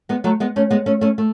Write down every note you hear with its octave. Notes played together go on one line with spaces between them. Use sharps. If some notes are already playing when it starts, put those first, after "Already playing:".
G#3 B3
F#3 A3
G#3 B3
A3 C#4
G#3 B3
A3 C#4
A3 C#4
A3